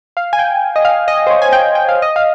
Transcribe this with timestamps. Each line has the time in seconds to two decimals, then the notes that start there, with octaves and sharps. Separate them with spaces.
0.17 F5
0.33 G#5
0.39 G5
0.76 D#5
0.85 F5
1.08 D#5
1.27 C5
1.30 C#5
1.42 G#5
1.52 G5
1.75 G5
1.89 F5
2.02 D#5
2.16 F5